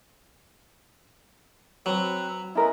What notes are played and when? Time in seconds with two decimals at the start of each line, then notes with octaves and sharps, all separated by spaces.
1.86 F#3 C4 B4
2.55 G#3 B3 C#4 E4 A#4 B4